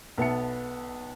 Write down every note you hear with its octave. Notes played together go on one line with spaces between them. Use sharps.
B1 B3 E5 A5 C#7